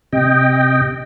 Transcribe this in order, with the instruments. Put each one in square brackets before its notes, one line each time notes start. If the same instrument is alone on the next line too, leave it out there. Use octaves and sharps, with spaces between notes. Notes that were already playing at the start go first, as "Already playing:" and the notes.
[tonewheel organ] C3 D#5 G5